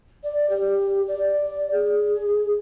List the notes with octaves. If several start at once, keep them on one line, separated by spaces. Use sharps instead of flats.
D5
G4
D5
G#4